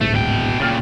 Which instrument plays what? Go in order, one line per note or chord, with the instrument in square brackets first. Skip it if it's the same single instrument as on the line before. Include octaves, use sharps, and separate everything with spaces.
[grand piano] D1 G#1 [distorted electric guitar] A3
[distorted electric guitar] B2 G5
[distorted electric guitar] A#2 C#3 [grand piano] G5 F6 A6